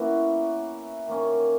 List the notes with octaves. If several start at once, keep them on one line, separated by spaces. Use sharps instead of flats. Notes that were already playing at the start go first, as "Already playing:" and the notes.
Already playing: B2 A#3 C#4 E4 F#4
D#3 A#3 C#4